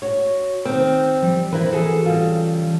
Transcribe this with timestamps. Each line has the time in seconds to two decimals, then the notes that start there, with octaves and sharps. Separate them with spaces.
0.02 F#4 C#5
0.65 D#3 C4
1.23 F3 G3
1.53 E3 C4 E4 A#4 B4
1.72 F#4 G#4 A4
2.05 C#3 G3 F4